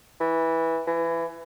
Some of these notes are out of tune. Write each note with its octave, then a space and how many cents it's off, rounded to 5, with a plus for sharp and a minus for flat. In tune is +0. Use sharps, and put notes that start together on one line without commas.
E3 -10
E3 +20